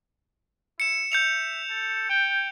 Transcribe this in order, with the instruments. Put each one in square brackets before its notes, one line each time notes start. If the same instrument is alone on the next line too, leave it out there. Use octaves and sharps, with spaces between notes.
[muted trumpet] E4 [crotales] C#7 E7
[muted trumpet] E5 [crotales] G6 C#7 F7
[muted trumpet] A4
G5